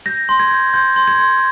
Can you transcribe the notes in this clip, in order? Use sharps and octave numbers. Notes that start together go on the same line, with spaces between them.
G6 A#6
C6
G#6
G6
C6 G6
C6
G#6
C6